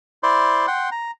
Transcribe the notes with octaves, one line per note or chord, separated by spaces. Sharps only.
E4 C5 D5 C6
F#5 G5 C6
A#5